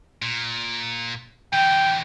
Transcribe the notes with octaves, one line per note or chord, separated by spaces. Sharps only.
A#2
D3 E3 G5